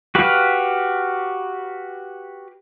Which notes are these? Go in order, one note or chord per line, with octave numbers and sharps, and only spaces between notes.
F#4 G4 B4 F5